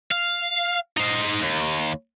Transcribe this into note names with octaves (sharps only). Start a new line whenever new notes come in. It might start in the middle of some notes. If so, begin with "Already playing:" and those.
F5
D#4 C5
D#2